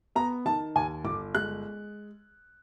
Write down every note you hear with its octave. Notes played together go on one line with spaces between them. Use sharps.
B3 A#5
D#3 A5
D#2 G#5
G1 D6
G#3 F#6